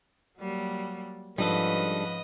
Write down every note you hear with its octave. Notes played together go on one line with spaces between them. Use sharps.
F#3 G3 A#3
F2 G#2 G3 C#4 D4 A4 B4 D#5